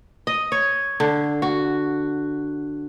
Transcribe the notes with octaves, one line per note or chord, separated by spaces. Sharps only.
D#5
C#5
D3
F#4